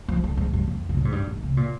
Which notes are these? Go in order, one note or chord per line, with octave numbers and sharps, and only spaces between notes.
F3
D3
G#2
G2
F2
C3
A#2
G#2
G2
G#2
C3
A#2